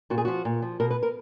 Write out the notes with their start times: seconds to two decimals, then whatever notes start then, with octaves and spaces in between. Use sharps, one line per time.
0.10 A#2 F#4
0.18 G#4
0.25 F3 F#4
0.45 A#2
0.62 F3
0.80 B2 A#4
0.90 B4
1.03 A#4